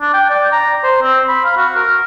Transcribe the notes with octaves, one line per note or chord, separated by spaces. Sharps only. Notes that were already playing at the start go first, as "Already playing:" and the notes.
D4
G5
D5
A#5
C5
C4
B5
F5
F#4
A#4